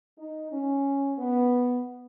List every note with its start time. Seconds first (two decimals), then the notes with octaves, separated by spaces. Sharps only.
0.18 D#4
0.52 C#4
1.18 B3